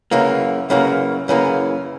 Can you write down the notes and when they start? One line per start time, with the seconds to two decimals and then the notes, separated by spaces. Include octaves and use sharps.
0.11 F#2 C#3 E3 A#3
0.70 F#2 C#3 E3 A#3
1.28 F#2 C#3 E3 A#3